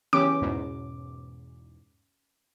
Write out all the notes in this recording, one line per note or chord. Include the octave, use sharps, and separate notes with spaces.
E3 B3 C#4 G4 D6
E2 G#2 B2